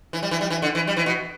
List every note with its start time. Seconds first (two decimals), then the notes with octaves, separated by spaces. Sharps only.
0.13 E3
0.23 G3
0.31 E3
0.41 G3
0.50 E3
0.62 D3
0.75 E3
0.87 G3
0.97 E3
1.06 B2